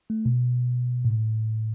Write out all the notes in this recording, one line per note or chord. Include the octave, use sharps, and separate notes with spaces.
A3
B2
A2